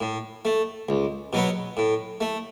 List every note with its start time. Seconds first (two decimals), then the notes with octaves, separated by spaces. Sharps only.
0.01 A2
0.45 A3
0.89 C#2
1.33 B2 F#3 B3
1.77 A2
2.21 A3